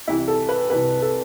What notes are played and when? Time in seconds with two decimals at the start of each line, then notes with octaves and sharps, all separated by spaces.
0.08 C2 C3 E3 E4
0.28 A4
0.49 B4
0.70 C2 C3 E3 B4
1.02 A4